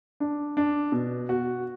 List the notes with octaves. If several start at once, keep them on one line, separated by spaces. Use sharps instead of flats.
D4
D4
B2
F#4